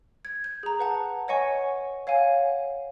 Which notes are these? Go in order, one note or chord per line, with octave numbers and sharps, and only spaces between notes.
G#6
G6
G#4 A#5
B4 F#5 A5
C#5 D#5 F#5 G#5 C#6
C#5 F5 F#5 G#5